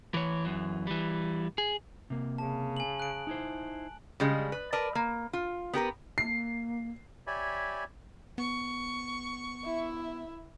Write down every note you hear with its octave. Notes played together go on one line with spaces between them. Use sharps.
E3 C#5
F#2 E3
E3 G3
G#4
C3 A#3
C#3 A5
G#5 F#7
F#6 D7
D#4 E4 C5
C#3 G3 G#3
B4
A#4 B4 D5 A5
A#3
F4
B3 G4 A#4 B4
A#3 C7
G4 C#5 D5 E5 G#5 B5
B3 C#6
E4 E5